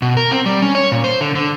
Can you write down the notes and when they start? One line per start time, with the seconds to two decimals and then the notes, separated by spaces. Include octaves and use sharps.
0.02 B2
0.17 A#4
0.31 C4
0.46 G3
0.62 C#4
0.75 C#5
0.92 A#2
1.04 C5
1.21 D3
1.35 D3